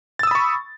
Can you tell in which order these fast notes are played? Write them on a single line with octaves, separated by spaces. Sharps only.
A6 E6 D#6 B5 C#6